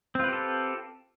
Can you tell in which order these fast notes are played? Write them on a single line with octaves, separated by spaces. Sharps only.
C4 F4 B4 G4 A4